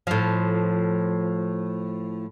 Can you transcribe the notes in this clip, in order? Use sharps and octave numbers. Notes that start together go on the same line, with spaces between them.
A2 F3